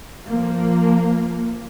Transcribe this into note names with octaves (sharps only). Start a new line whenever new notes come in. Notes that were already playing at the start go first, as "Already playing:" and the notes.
F3 A#3